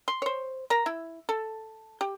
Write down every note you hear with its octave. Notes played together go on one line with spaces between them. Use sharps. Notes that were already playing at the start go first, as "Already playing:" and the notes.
C6
C5 C#5
A#4 A#5
E4
A4
G4